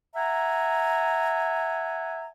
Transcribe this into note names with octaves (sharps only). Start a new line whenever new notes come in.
E5 F#5 G#5 A#5